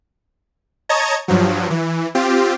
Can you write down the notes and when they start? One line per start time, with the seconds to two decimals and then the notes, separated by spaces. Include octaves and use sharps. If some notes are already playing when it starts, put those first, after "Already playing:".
0.89 C#5 D#5 A5 A#5 G#6
1.28 G2 F3 F#3
1.70 E3
2.15 C4 F4 G4